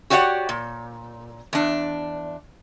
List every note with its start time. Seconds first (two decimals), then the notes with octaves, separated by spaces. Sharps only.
0.10 F#4 G4 C#5 D5 F5 F#5
0.49 A#2
1.53 E2 D4